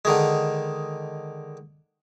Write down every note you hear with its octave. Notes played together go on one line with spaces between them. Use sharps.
D3 D#3 G#3